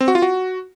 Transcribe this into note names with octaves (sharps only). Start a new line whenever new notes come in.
C4
F#4
F4
F#4